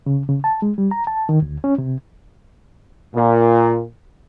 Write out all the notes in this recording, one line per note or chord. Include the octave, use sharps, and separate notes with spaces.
C#3
C#3
A5
G#3
G3
A#5
A5
D#3
D2
C#4
C3
A#2